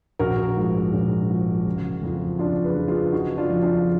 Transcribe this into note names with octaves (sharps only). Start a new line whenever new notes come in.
A#1 F#4 A#4
G#2 F3
A#1
G#2 F3
F#1
F2 F3
F#1 D4 F4
G#4 B4
F2 F3
F4 G#4
F#1 D#4 F#4
D4 F4
F2 F3
D4 F4